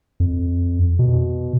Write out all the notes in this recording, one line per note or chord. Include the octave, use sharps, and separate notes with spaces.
F2
B2